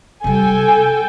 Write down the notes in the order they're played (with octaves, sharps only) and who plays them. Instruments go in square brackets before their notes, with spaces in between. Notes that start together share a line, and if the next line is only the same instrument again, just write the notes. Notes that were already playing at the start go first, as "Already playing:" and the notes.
[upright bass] C3 G3 [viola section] A4 G5 [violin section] G#5